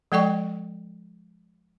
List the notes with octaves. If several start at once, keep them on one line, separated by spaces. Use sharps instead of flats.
F3 G#3 A4 D5 G5 C#6